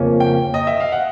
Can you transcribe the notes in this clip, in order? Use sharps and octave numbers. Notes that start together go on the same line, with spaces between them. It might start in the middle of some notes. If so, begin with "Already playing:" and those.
Already playing: F2 C#3 F3 A#3 C#4
G5
D#5
E5
F5
F#5